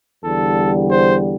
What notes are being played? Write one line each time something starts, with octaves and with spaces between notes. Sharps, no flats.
E2 D3 G3 A4
C5